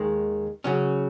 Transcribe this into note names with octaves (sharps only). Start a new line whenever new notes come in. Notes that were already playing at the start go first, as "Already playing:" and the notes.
Already playing: D#2 D#3 G#3
C#3 F#3 C#4